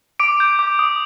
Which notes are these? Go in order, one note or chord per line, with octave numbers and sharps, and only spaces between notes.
D6 D7
G6
D6
D#6